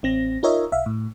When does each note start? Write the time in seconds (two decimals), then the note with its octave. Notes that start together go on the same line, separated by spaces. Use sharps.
0.03 A1 C4 A#6
0.43 D#4 F4 A#4 C#5 D#5 E5
0.72 B1 E5 F5
0.86 A2